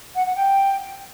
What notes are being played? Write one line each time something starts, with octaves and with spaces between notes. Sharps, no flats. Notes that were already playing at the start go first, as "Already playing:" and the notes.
F#5
F#5
G5